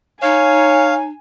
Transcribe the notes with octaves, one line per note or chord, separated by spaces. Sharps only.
D#4 C#5 F5 G#5